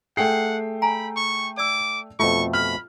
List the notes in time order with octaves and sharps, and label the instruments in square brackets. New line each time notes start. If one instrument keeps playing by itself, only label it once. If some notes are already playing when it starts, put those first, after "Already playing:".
[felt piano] A3 G5 C7 [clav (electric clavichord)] G#4 [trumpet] F#5
[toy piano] G#5 A#5 [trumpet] B5
[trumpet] C#6
[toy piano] D5 E6 [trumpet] D6
[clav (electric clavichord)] F2 B2 A3 [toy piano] F4 [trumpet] C#6
[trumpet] B5 [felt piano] F6